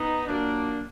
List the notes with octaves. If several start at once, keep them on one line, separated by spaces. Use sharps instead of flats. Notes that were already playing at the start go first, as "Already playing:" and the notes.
Already playing: B3 D#4
A#2 F#3 A#3 D4